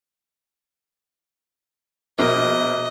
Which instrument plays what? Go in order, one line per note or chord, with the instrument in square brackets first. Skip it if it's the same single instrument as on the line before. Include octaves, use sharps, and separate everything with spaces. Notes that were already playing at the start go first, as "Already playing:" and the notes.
[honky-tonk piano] A#1 B2 A#4 [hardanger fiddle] D#5